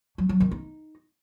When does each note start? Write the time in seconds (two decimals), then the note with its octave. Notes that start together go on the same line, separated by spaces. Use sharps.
0.18 F#3
0.29 F#3
0.40 D#3
0.51 D#4